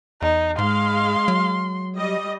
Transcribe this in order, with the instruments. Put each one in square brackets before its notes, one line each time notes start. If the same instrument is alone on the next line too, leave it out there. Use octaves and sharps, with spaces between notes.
[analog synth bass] E2 [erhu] D#4
[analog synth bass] G#2 [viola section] G#3 F5 [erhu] C6
[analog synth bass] F#3
[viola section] G3 D#5